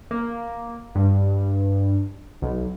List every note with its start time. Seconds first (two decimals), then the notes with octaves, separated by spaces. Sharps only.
0.11 A#3
0.95 G2
2.42 B1